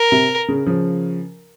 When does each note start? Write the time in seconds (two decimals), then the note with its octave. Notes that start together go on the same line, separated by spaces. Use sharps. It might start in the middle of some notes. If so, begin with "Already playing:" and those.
Already playing: A#4
0.12 C3
0.48 C#3
0.66 C#3 F3